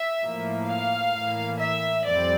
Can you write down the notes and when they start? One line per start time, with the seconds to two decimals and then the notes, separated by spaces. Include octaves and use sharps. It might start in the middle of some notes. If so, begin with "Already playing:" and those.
Already playing: E5
0.22 A2 F3 A#3
0.67 F5
1.14 A2 E3 A#3
1.59 E5
2.06 F2 E3 G3 C4 D5